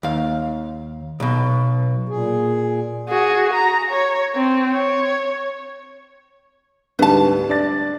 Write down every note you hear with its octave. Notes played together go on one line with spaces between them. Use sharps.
D#2 F5
B1 B2
A#2 G#4
F#4 G#4
A#5
C#5
C4
C#5
D2 G#2 G3 B4 A5
D4 D5 A6